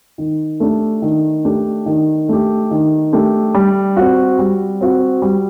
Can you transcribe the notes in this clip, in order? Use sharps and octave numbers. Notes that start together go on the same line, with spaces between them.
D#3
A3 D4 G4
D#3
A3 D4 G4
D#3
A3 D4 G4
D#3
A3 D4 G4
G3
C4 F#4
G3
C4 F#4
G3